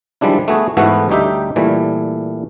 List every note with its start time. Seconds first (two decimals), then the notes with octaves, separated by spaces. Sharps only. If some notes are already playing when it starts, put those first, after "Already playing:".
0.21 D#3 F3 G3 G#3 D4 E4
0.48 A3 B3 F#4 G#4
0.77 G#2 E3 A3 B3 E4 F#4
1.09 D2 G3 D#4 G4 E5
1.56 A#2 E3 G3 A3